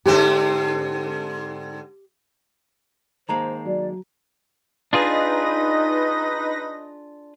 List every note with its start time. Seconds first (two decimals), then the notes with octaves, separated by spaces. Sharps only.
0.06 G#2 D3 C4 G4 E5
3.29 D#3 G#3 A#3 C5 A5 A#5
3.65 F#3 D5
4.93 D4 D#4 F4 G#4 B4 D#5 A#6